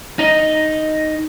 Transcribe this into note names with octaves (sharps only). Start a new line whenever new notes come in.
D#4 D#5